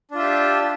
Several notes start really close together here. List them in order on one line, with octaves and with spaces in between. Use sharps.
D4 F4 E5 G4